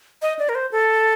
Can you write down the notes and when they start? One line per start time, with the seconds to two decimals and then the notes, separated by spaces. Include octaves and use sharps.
0.22 D#5
0.39 D5
0.49 A#4
0.55 C5
0.72 A4